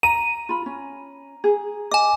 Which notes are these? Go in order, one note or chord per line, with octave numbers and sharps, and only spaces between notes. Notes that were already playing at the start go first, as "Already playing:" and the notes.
A#5 D#7
F4 B5
C#4
G#4
D#5 G#5 D6